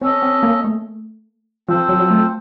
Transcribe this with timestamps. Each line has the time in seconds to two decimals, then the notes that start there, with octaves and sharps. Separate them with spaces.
0.01 C4 C#4 A4 D#5
0.22 C4
0.43 A#3
0.64 A3
1.68 F3 C4 F4 A4 C5
1.89 F#3
2.00 F#3
2.11 A3